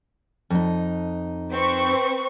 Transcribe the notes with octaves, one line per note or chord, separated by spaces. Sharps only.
F2 D#4
C4 B4 C#6